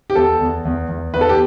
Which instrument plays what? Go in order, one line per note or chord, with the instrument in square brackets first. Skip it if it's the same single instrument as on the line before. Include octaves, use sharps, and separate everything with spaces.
[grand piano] G4
E2 A4
E2
E2
E2
E2 B4
A4
G4